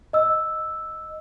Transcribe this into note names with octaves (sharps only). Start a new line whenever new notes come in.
D#5 E6